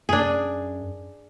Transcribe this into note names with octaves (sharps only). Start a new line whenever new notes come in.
F#2 D4 G#4